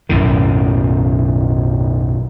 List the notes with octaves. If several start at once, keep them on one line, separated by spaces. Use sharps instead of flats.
B1 F#2 A2 D#3